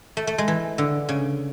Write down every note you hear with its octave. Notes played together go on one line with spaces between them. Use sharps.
A3
A3
G#3
E3
D3
C#3